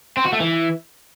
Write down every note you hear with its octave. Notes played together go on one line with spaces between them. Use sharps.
C4
F#4
A3
E3